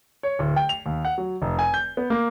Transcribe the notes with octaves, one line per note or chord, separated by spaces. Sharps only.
C#5
D1
G5
F7
D#2
F#5
F#3
F1
G#5
G6
B3
A#3